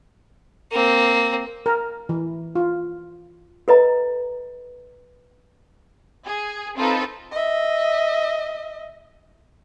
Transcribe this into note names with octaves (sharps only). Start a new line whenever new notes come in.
A#3 C4
A#4
E3
F4
A4 B4 D#5 A#5
G#4
C4 D#4 F4 A4 B4
D#5 E5